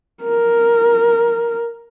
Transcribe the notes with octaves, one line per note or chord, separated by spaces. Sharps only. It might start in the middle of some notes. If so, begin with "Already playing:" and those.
A#4